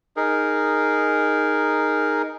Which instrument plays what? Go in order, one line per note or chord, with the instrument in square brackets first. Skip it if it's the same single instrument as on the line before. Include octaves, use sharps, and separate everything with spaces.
[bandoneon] D#4 G#4 A#4